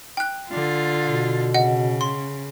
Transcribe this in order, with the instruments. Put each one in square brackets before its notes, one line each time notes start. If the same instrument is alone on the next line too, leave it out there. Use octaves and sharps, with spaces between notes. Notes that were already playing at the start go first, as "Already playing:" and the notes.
[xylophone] G5 F#6
[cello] D3 F4
[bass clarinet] B2
[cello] C#3 [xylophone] D#5 F#5
[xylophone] C6